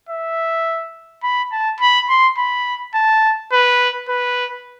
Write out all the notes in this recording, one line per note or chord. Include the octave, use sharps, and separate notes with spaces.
E5
B5
A5
B5
C6
B5
A5
B4
B4